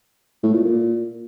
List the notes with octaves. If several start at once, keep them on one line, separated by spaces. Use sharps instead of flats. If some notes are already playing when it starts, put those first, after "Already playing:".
A2
A#2
A#2